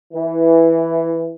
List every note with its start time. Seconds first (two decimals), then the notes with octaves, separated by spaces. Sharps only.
0.14 E3